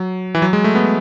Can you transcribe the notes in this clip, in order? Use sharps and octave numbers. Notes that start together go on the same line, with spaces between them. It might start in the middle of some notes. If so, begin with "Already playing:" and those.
Already playing: F#3
E3
F#3
G#3
A3
B3